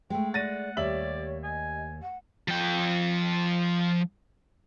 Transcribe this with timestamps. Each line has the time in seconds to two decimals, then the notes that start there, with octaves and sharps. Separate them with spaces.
0.10 G#3 A3 G5
0.34 D5 F#5 A6 A#6 D#7
0.77 D#2 G3 C#5 D5 E5 F#7
1.44 D#5 G#5
2.02 F#5
2.48 F3 G5